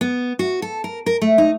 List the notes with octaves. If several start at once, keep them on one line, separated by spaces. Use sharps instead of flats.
B3
F#4
A4
A#4
A#4
A3
D#4